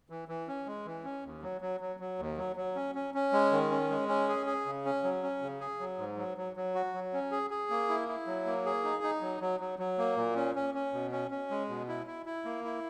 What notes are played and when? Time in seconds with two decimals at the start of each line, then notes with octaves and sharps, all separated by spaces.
0.10 E3
0.28 E3
0.48 C#4
0.66 G#3
0.86 E3
1.04 C#4
1.24 D#2
1.42 F#3
1.61 F#3
1.80 F#3
2.00 F#3
2.19 D#2
2.37 F#3
2.56 F#3
2.75 C#4
2.95 C#4
3.14 C#4
3.33 G#3
3.52 D#3
3.71 C#4
3.90 G#3
4.09 C#4
4.28 G#4
4.46 G#4
4.66 C#3
4.85 C#4
5.03 F#3
5.23 C#4
5.42 C#3
5.60 G#4
5.80 F#3
5.98 G#2
6.17 F#3
6.37 F#3
6.56 F#3
6.75 F#4
6.94 F#3
7.13 C#4
7.31 G#4
7.50 G#4
7.70 A#3
7.89 E4
8.08 E4
8.26 F#3
8.46 A#3
8.65 G#4
8.84 D#4
9.03 D#4
9.21 F#3
9.41 F#3
9.60 F#3
9.79 F#3
9.98 A#3
10.16 A#2
10.35 C#4
10.55 C#4
10.75 C#4
10.93 B2
11.12 C#4
11.31 C#4
11.50 G#3
11.69 B2
11.89 E4
12.07 E4
12.26 E4
12.45 A#3
12.64 E4